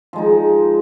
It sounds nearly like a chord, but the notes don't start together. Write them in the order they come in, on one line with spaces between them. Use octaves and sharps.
F3 G#3 D#4